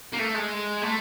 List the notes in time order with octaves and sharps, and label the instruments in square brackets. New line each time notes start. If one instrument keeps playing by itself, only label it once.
[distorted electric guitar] A#3
A3
G#3
A3